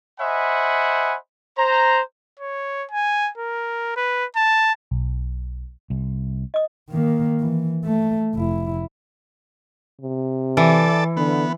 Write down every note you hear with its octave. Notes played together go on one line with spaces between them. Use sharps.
C5 D#5 E5 F#5 G#5 B5
C5 A#5
C#5
G#5
A#4
B4
A5
B1
C2
D#5 D#6
D#3 A#3
E3
A3
F1 E4
C3
E3 A4 D5
D3 B3